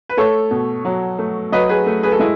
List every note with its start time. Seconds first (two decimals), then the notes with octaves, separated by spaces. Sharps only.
0.09 B4
0.17 A3 A4 C#5
0.51 B2
0.85 F#3
1.19 A3
1.52 F#3 B4 D#5
1.69 G#4 B4
1.86 A3
2.03 G#4 B4
2.12 A4
2.19 G#3 E4 G#4